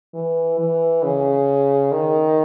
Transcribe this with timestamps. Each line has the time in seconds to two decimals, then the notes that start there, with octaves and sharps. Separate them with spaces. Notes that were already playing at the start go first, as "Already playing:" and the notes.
0.14 E3
0.59 E3
1.03 C#3
1.92 D#3